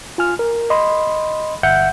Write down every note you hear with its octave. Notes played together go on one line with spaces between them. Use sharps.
F4 G#5 F6
A#4
D#5 B5 C6
G1 E5 F#5 G6 C#7